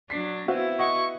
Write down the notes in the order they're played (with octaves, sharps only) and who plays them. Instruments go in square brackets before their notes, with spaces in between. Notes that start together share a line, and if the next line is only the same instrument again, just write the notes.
[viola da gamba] F#3 D4 [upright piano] B6 C7
[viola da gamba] B3 E4 [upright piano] C4 [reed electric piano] F#4 E5 F5
[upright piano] D#5 F#5 [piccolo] C#6